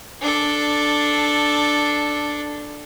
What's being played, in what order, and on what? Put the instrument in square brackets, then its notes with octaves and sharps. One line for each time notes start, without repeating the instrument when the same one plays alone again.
[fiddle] D4 A4